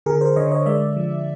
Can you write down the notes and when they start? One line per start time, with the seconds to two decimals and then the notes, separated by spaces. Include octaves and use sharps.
0.06 D3 G#4 A#4
0.21 A#4 C5
0.36 D3 C#5 D#5
0.51 C#5 D#5
0.66 G#3 D5 E5
0.97 F3